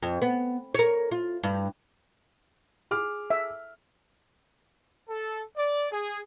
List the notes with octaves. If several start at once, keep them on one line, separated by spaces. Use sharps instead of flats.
F2
B3
A#4 C#5
F4
G2
G#4 D6 F6
E5
A4
D5
G#4